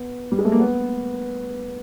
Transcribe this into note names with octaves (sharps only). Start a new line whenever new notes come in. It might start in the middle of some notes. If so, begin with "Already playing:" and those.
Already playing: B3
G3
G#3
A3
A#3
B3